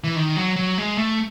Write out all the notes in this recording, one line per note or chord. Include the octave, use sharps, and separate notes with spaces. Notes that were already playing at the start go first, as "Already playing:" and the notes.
E3
D#3
F#3
F#3
G#3
A3